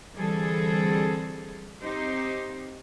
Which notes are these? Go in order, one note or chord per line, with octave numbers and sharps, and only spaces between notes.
D3 E3 G3 C4 G#4 A4
C4 D#4 G4 C5